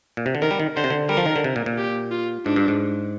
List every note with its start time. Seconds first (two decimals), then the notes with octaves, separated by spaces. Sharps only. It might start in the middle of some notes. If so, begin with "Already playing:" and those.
0.17 A#2
0.26 C3
0.35 D3
0.42 D#3 A#4
0.51 G3
0.60 D#3
0.77 D3 C5
0.84 C3
0.90 D3
1.09 G3 A#4
1.17 F3
1.26 D#3
1.36 D3
1.44 C3
1.56 A#2
1.66 A#2
1.78 G4
2.12 F4
2.45 G#2 D4
2.56 G2
2.68 G#2